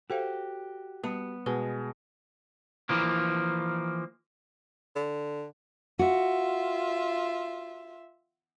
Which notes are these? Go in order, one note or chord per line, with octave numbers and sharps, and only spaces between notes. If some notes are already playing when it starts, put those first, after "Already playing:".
F#4 G4 A4 C5 F5
G3 B3 A5 B5
B2 G#3 B4
E3 F3 A#3
D3
F4 F#4 E5